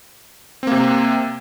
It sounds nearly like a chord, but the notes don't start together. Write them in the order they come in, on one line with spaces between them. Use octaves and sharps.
C4 A#3 C3